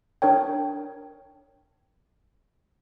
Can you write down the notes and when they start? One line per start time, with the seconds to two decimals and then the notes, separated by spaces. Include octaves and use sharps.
0.22 D4 A#4 C#5 G5